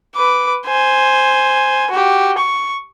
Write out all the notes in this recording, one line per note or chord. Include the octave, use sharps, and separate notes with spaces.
B4 D6
C5 G#5
F#4 G4
C#6